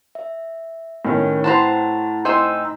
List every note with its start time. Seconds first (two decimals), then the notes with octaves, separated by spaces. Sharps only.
0.15 E5
1.05 A2 D#3 C#4
1.44 C4 E4 B4 C5 F#5 A5 A#5
2.25 C4 D#4 C5 G#5 E6